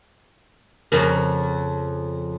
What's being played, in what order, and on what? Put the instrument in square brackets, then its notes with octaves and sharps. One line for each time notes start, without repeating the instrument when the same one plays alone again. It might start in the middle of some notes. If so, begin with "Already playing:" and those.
[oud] F2 C#3 A#4